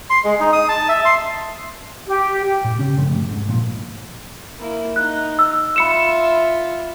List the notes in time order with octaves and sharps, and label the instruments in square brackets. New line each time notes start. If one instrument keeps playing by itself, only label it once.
[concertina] C6
G#3
D#4
D#6
A5
E5
C6
[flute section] G4
[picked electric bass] A2
C#3 C#4
F#2 C#3 F3 A3
F#2
G#2
A#1 A#2 F3
[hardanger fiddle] A#3 E4
[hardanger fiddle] D#4 [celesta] F#6
[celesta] E6
[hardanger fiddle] F4 E5 [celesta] B5 C#7 E7